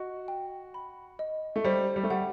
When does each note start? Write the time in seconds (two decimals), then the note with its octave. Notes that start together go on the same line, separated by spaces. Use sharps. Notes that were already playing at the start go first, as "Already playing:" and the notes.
Already playing: F#4 D#5
0.28 G5
0.74 B5
1.19 D#5
1.56 A3
1.64 G3 C5
1.96 G3
2.04 A3
2.10 G3 F#5